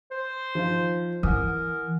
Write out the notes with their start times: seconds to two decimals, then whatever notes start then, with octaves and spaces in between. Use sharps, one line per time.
0.11 C5
0.55 F3 D#4 F4
1.23 E3 A#4 F#5 G#5 D#6